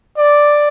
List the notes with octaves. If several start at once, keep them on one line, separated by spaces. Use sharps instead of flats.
D5